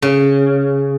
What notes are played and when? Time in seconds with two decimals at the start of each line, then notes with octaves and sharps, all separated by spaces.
0.02 C#3